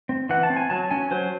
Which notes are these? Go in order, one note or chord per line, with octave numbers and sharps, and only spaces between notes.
C4
E3 F#5
A5
C4
G#5
F#3 A5
C#4 G#5
F#3 C5